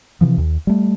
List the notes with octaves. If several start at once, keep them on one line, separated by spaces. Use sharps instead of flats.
C3 E3 F3
D#2
G3 A3